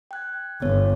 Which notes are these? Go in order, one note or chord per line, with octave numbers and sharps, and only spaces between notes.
G5 F#6 G#6
G1 B3 C#5